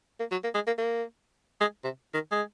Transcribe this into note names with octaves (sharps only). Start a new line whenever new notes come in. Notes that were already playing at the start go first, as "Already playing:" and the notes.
A#3
F#3
A#3
G#3
A#3
A#3
G#3
C3
D#3
G#3